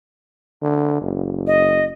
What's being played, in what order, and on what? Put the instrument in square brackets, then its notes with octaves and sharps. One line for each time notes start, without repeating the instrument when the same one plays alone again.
[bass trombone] D3
F#1
[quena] D#5